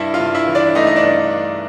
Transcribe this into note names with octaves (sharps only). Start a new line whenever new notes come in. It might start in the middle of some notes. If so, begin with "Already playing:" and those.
Already playing: G2 E4 E5
F4 F5
G2
E4 E5
E3
D4 D5
A3 D#4 D#5
D#5
D4 D5
G2